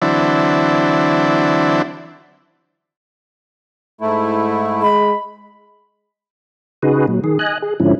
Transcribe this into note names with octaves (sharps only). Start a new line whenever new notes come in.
D3 E3 F#3 C4 D4 E4
G#2 A3 E4
G#3 B5
C#3 D#4 F#4 G#4 B4
A#2 F#3
D#3 G#4
D#5 G#5 F#6
G#4
G#2 D3 F3 C#4 E4